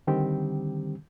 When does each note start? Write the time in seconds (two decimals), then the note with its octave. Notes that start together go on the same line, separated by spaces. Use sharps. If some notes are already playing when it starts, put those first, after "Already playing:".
0.07 D3 D#3 G3 C4 G4